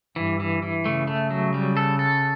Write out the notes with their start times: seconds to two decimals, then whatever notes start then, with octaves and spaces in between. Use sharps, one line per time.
0.16 G2 E3
0.40 E3
0.63 E3
0.85 C#3 A3
1.08 A3
1.31 F#3
1.54 G3
1.77 A4
1.99 A4